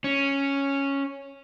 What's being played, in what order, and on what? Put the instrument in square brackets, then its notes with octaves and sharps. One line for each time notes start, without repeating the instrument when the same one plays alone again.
[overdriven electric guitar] C#4